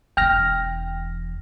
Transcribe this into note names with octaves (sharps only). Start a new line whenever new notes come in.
E1 E2 G5 F6 A#6